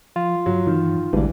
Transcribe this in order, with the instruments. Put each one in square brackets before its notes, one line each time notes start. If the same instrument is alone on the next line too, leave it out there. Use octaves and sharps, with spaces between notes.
[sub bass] F3 [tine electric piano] F4
[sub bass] G2 [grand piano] F#3
[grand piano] D#3 [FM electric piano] E3
[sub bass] A1 [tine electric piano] D2 G2 [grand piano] E3 [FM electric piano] G#3 D4